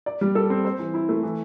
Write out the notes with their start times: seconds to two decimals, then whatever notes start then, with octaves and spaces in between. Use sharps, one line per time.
0.06 D5
0.21 G3
0.35 A4
0.50 C4
0.65 C5
0.79 E3
0.94 E4
1.09 A3
1.23 E3